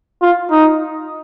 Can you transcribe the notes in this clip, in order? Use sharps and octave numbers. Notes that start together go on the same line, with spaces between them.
F4
D#4